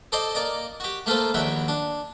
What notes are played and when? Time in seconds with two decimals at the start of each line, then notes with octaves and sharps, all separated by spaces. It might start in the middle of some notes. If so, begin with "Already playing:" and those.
0.12 A4 C5 D5 D#5 C6
0.35 A#3 D5 D#5
0.80 F#4 G4
1.06 A3 A#3 F4 A4 C5
1.34 A#1 D#2 E4 F#4 G5
1.68 D4